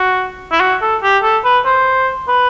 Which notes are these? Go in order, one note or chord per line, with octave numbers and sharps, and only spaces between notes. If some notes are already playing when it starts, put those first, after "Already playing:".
Already playing: F#4
E4
F#4
A4
G4
A4
B4
C5
B4